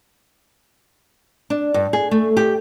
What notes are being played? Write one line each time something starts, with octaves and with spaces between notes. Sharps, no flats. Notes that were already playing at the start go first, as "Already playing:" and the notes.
D4
G2
G#4
A3
G4